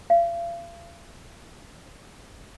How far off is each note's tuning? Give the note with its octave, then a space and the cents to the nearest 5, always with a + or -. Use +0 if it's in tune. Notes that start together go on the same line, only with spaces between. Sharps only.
F5 -40